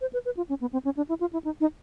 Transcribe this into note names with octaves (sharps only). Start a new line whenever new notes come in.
C5
B4
B4
F4
C#4
B3
C4
C#4
D4
E4
F4
E4
D#4
D#4